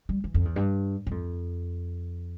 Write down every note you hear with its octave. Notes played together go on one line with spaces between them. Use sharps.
G3
E3
F2
E2
G2
G2
F2